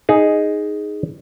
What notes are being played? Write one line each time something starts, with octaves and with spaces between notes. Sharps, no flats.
D#4 G#4